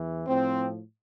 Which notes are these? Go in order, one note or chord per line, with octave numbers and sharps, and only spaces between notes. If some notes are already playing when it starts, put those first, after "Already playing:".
Already playing: E2 E3
A2 F3 C4